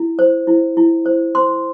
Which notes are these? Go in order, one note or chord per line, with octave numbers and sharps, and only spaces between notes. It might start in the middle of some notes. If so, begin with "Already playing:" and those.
Already playing: E4
C5
E4
E4
C5
C5 C6